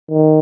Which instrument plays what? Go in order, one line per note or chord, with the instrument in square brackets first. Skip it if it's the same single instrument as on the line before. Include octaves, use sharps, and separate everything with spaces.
[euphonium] D#3